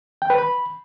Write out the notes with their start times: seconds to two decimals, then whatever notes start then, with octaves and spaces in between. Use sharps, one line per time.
0.22 G5
0.30 B4
0.38 B5